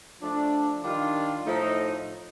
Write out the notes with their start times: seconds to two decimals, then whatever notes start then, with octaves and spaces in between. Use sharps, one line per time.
0.21 F3 A3 D4
0.83 D#3 G3 D4 F4
1.46 A2 F3 A3 D#4